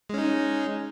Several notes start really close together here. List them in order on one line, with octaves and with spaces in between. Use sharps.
G#3 C#4 D#4